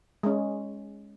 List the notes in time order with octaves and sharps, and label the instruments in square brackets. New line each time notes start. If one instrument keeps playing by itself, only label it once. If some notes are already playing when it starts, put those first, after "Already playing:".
[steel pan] G#3 C#4